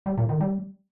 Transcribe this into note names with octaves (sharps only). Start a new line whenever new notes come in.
G3
A#2
D#3
G3